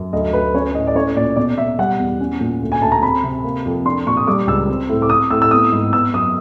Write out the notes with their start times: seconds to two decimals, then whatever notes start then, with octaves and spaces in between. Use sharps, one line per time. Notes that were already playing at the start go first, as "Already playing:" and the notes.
Already playing: F#2
0.13 D2 D#5
0.33 D2 B4
0.55 C#4 C#5
0.75 A2 D#5
0.87 D5
0.95 C#4 C#5
1.16 A#2 D5
1.36 B2 D5
1.57 B2 E5
1.79 G3 F#5
1.99 E2
2.20 C#4
2.40 A#2
2.62 D2
2.72 G#5
2.82 D2 A5
2.92 A#5
3.03 C4 B5
3.24 C3
3.44 A#3
3.66 F2
3.86 D4 C6
4.06 A#2 C#6
4.17 D#6
4.27 G3 D6
4.47 C#2 E6
4.69 C4
4.89 A2
5.02 D6
5.10 C4 D#6
5.30 A2 E6
5.42 E6
5.51 B3 D#6
5.72 G#2
5.93 B3 E6
6.13 F#2 D#6